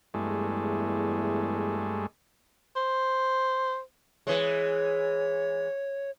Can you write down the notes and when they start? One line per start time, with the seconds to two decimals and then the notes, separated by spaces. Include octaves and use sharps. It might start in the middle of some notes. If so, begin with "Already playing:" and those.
0.14 E2 G2 G#3 A3
2.76 C5
4.27 E3 G#3 C#5